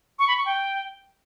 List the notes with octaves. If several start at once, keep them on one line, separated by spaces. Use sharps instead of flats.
C#6
B5
C#6
G5